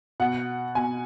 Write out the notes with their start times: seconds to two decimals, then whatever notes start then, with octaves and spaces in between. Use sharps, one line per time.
0.20 B2 F#5
0.75 B2 G#5